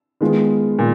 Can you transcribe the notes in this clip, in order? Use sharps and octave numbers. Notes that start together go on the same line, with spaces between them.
D#3 G#3 B3 F4
A#2 D#3